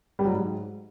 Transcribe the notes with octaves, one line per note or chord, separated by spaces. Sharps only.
G3
F#3
G#2